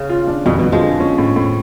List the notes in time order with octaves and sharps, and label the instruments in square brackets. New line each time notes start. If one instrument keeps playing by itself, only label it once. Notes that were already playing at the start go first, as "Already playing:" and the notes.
Already playing: [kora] C#3
[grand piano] F4
D4
[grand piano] F2 [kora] B2
[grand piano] F2 [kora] B2
[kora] F3 G#3
[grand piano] D3
C#4
A2
A2